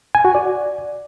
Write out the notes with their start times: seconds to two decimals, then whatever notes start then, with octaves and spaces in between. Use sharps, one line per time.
0.15 G#5
0.25 F#4
0.35 D5